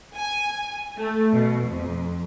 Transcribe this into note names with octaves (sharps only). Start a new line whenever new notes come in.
G#5
A3
B2
F2